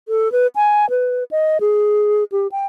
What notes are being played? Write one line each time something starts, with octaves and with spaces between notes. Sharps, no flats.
A4
B4
G#5
B4
D#5
G#4
G4
G5